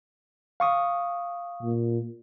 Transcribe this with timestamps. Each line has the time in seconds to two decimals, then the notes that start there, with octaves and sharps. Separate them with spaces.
0.60 F5 C#6 D#6
1.63 A#2